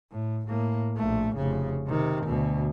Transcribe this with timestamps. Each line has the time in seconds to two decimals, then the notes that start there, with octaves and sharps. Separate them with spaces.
0.12 A2
0.48 A2 A#3
0.97 A#1 A3
1.35 F1 C#3
1.87 C3 D#3
2.25 D2 B2